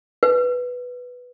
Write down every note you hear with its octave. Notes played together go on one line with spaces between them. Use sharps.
B4